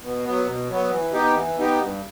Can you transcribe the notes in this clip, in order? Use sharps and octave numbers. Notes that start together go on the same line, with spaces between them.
B2
F#3 B3
B2
F#3 B3
E3
B3 D#4 G4
E3
B3 D#4 G4
G2